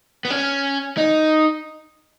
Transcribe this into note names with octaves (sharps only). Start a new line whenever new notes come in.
B3
C#4
D#4